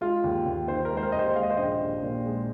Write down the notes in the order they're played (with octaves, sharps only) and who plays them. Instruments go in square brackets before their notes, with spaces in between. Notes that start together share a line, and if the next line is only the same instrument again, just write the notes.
[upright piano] G#3 F4
D#2
D#2
D#3 C5
A#4
G#3
C5
A#4
D#2 D#5
C5
G#3 F5
D#5
C5
A#1 D#5
A#1
A#2
G#3